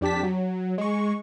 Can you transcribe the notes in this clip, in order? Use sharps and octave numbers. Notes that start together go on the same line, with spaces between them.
F2 D4 G4 A5 B6
F#3
G#3 C#6